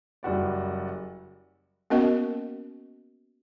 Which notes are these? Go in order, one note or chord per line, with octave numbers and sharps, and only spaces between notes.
F#1 G3 F#4 D5
A#3 B3 C#4 F#4 A#4 D#5